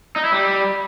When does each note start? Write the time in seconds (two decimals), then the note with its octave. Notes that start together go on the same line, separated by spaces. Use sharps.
0.16 D#4
0.24 E4
0.32 G3